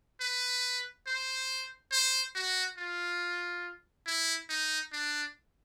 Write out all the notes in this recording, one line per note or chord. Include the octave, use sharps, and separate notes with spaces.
B4
C5
C5
F#4
F4
E4
D#4
D4